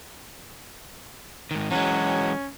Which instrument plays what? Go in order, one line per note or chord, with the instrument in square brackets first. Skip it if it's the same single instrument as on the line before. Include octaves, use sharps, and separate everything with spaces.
[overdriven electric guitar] G#2 D#3
[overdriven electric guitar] E3 G#3 [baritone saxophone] F#3 [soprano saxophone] C#4